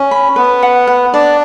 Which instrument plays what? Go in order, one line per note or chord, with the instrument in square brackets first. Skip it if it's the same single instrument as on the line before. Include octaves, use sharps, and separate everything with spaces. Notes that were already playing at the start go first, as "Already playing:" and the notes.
Already playing: [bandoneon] C#4
[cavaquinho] B5
[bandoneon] B3 [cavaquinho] B4
[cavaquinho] F#5
F#5
[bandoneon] D4 [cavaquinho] D5